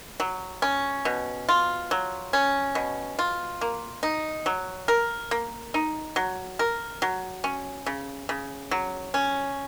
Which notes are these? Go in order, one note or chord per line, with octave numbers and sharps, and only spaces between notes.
F#3
C#4
B2
F4
F#3
C#4
B2
F4
A#3
D#4
F#3
A#4
A#3
D#4
F#3
A#4
F#3
C#4
C#3
C#3
F#3
C#4